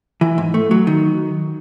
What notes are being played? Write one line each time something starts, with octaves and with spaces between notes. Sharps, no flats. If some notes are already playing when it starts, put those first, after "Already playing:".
E3
G#2
A3
F#3
D#3